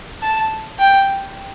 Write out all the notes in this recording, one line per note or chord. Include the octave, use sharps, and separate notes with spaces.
A5
G5